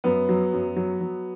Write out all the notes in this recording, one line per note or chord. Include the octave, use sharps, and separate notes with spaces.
F#2 B3
F#3
F#2
F#3
F#3